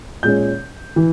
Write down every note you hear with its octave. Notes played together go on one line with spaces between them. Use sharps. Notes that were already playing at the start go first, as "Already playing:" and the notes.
A#2 G#3 C#4 G6
E3